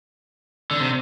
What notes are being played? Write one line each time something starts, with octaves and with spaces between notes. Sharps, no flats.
D3
C3